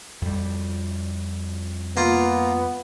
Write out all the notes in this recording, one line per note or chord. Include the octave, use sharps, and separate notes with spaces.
F2 G3
A#3 B3 F4 A#5